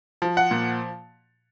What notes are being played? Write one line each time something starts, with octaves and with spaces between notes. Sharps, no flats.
F3
F#5
A#2